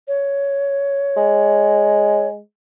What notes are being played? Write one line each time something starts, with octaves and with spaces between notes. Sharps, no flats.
C#5
G#3